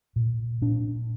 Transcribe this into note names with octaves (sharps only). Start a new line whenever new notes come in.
A#2
A#2 D4